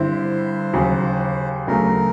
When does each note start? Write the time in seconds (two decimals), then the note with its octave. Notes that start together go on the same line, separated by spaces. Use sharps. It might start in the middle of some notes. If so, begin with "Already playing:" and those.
Already playing: G2 D3 G3 C4 E4 C5
0.73 D#2 C#3 F#3
1.67 D2 C#3 F#3 A3 A#4